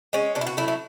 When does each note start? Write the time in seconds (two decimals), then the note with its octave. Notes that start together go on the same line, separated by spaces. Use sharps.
0.13 G#3 C#4
0.35 B2 D4
0.41 E4
0.47 F#4
0.57 F#3 A3 E4
0.68 E4